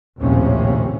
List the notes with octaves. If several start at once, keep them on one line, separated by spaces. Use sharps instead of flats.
A#1 D#2 A2 C3 C#4